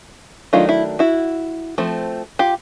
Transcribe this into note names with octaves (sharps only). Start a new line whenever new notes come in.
D#3 F#3 A3 D4 D#4 F4
E4
E4 F#4
F3 A3 C4
F4 G4